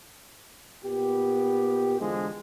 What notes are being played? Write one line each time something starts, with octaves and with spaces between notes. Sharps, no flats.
A#2 B3 G4
E2 G2 D3 F3 G#3